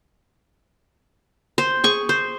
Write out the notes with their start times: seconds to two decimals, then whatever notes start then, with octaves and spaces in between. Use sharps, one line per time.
1.58 C5
1.84 G#4 C#6
2.09 C5